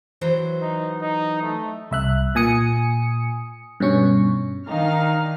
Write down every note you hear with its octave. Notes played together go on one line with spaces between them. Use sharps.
E3 F#3 C5
D#4
D#4
A3
C2 E5 F#6
A#2 G#5 D#6 C#7
G2 B2 C#4 C#6
D#3 D4 D#4 F5 F6